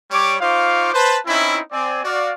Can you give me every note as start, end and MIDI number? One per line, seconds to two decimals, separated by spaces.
0.11 0.36 55
0.11 0.36 73
0.11 0.36 86
0.41 0.92 63
0.41 0.92 65
0.41 0.92 72
0.41 0.92 77
0.41 0.92 85
0.41 0.92 86
0.93 1.17 71
0.93 1.17 72
0.93 1.17 81
1.26 1.60 60
1.26 1.60 61
1.26 1.60 63
1.26 1.60 64
1.72 1.99 60
1.72 1.99 74
1.72 1.99 80
2.03 2.32 66
2.03 2.32 74
2.03 2.32 77